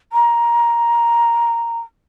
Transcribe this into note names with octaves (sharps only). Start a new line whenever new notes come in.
A#5